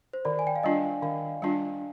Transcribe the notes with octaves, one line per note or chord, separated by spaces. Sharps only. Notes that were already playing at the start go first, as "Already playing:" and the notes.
C5
D#3 D5
G#5
G5
F5
G3 D4 F4 D#5
D#3 F5
G3 D4 F4